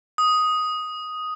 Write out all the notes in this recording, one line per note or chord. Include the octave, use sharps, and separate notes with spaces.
D#6